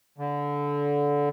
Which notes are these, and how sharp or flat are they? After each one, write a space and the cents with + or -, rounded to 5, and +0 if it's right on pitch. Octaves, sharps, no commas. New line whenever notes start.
D3 -20